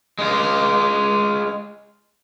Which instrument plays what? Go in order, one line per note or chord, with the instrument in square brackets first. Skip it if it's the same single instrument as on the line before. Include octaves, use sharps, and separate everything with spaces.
[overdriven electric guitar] G#3 F4